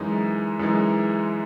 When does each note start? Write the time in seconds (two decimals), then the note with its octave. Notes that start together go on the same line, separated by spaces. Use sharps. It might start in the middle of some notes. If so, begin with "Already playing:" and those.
Already playing: F#2 E3 G#3 D#4
0.59 F#2 E3 G#3 D#4